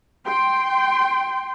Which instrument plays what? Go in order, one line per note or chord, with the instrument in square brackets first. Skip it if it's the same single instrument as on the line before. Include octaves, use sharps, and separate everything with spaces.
[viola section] G5 C6